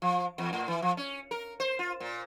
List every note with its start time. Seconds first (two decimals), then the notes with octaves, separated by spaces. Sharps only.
0.02 F3
0.38 E2
0.53 A2
0.68 E3
0.82 F3
0.97 C#4
1.31 A#4
1.60 C5
1.79 F4
2.00 A#2